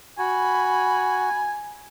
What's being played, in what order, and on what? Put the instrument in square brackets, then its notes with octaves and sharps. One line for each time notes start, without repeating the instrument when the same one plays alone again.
[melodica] F#4 [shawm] G#5 [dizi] B5